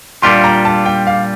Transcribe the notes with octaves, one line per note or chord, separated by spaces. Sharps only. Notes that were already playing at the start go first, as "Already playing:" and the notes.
A#2 G3 D4 F4 C6
A#5
A5
G5
F5